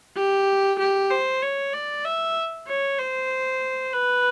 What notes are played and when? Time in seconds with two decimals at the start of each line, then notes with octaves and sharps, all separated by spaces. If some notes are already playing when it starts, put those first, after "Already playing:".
0.16 G4
0.79 G4
1.11 C5
1.42 C#5
1.73 D5
2.05 E5
2.67 C#5
2.98 C5
3.93 B4